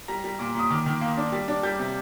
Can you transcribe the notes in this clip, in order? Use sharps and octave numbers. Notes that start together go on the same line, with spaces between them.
G3 A#5
G3
A#2 D6
A#2 D#6
D#3 D6
D#3
A#3
D4
G3
D4
G3 G6
C3